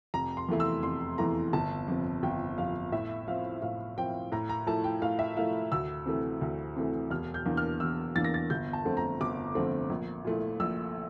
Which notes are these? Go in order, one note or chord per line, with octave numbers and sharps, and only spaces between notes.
F1 A#5
C6
E2 E3 A3 E4
E6
F1 C6
E2 E3 A3 E4 A#5
G1 A5
F2 C3 F3
G1 G5
F2 C3 F3 F5
A2 E5
F3 C4 F5
A2 F5
F3 C4 G5
A2 A#5
A#5
F3 A3 E4 A5
G5
A2 F5
E5
F3 A3 E4 F5
D2 E6
C3 E3 A3
D2
C3 E3 A3
E1 F6
G6
E2 E3 A#3 D4
F6
E1 E6
E2 E3 A#3 D4 A6
A#6
A6
G1 G6
A5
F2 D3 A3 C4
A#5
G1 D6
F2 D3 A3 C4
A#1
A#2 F3 A3 E4
A#1 E6